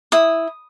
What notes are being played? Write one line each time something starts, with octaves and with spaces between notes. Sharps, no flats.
E4 D#6